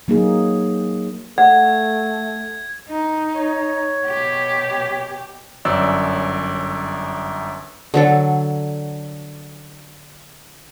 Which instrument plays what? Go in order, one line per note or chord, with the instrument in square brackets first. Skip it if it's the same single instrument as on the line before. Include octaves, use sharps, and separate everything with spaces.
[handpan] F#3 A#3 D#4 G#4
[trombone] A3 [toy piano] F#5 [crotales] G#6
[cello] D#4
[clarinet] C#5
[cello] B2 G4
[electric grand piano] G1 F#2 D5 E6
[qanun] D3 F#3 A4